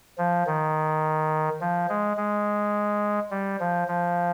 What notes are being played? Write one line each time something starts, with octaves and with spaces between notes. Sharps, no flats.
F3
D#3
F3
G#3
G#3
G3
F3
F3